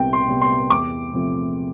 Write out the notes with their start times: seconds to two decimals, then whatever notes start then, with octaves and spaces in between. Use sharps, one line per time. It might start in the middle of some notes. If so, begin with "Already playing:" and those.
Already playing: C2 C3 G3 B3 G5
0.13 C6
0.27 C3 G3 B3
0.41 C6
0.70 E2 D6
1.13 C3 F3 A3